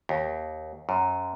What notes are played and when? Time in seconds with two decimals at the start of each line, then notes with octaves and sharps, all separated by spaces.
0.09 D#2
0.89 F#2